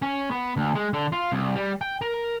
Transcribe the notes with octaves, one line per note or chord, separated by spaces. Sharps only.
C#4
B3
D2
G#3
D3
F4
C2
G3
G5
A#4